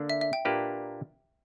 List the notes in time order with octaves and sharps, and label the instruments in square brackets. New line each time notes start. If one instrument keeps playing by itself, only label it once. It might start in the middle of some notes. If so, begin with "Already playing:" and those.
Already playing: [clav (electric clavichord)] D3 A#3 D4
[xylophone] E5
E5
G5
[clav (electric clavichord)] A#2 A#3 D4 G4 B4